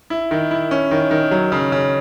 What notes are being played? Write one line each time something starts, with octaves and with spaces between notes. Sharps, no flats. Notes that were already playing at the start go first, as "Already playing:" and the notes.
E4
D#3
E4
C#4
D#3
D#3
F#3
C#3
C#3